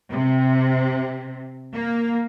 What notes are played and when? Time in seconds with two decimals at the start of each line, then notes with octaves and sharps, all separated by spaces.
0.11 C3
1.73 A#3